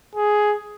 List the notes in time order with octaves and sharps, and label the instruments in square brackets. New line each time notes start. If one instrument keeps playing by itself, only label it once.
[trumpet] G#4